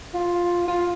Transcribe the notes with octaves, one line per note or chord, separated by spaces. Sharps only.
F4
F4